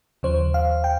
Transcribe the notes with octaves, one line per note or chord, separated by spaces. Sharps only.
D#2 C#3 F3 C5
F5
G5